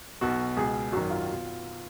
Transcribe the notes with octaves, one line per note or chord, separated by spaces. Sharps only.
B1 B2 F#4
C#2 B2 G#4
G#1 F#2 D#3 F#4
F4
B2